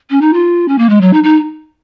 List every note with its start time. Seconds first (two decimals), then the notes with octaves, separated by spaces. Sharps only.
0.10 C#4
0.21 D#4
0.33 F4
0.68 C#4
0.78 A#3
0.89 G#3
1.01 F#3
1.13 D#4
1.23 D#4